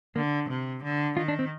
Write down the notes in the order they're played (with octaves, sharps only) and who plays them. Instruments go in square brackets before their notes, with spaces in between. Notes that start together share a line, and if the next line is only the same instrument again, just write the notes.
[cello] D3 [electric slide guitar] A#3
[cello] C3
D3
[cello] D#3 [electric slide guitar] F4
[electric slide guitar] D4
C4